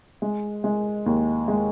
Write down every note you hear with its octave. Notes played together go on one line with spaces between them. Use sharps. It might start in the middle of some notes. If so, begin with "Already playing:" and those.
G#3
G#3
D#2
G#3